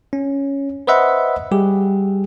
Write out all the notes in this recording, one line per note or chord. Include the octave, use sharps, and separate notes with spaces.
C#4
B4 C5 D#5 E5 F#5 B5
G3 G4 G#4